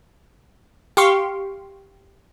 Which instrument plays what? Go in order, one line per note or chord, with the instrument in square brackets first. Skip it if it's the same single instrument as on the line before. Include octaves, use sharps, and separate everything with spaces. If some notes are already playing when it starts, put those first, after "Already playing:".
[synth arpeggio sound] G4 F5 C6 C#6